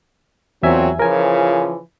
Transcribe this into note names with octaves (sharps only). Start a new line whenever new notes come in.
E2 A#2 F#3 C4 E5 G#5
C#3 E3 F3 A#4 G#5